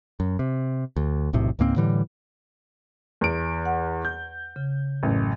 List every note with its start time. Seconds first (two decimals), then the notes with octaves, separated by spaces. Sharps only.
0.20 F#2
0.39 C3
0.96 D2
1.33 E1 B1 A2 C3
1.59 C#2 G#2 A#3 C4
1.76 A2 D3 E3 G3
3.21 E2 D7
3.65 F#5
4.05 G6
4.56 C#3
5.03 A1 F#2